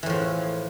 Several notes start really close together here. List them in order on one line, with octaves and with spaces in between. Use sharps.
E3 A2 F3